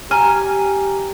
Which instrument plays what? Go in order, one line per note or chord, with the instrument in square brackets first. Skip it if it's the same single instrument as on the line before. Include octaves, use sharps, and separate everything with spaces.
[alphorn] G4 [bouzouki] G#5 [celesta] A#5 F6